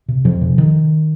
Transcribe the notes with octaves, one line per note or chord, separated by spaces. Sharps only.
C3
F2 F3
C3
D#3